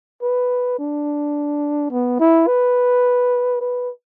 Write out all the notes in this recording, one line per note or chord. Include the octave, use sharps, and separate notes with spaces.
B4
D4
B3
E4
B4
B4